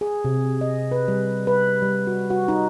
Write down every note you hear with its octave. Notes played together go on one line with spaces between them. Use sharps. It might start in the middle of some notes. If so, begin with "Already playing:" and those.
G#4
C3
D#5
B4
G3
B4
G3
F#4
F#4
D#4